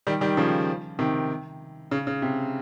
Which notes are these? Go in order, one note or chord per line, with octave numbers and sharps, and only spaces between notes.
D#3 G3
D#3 G3
C#3 F3
C3 D#3
C#3
C#3
C3